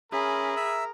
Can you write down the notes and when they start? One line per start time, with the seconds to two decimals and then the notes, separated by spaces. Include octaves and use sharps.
0.12 C#4 G#4 A#4 E5 B5
0.57 E5 E6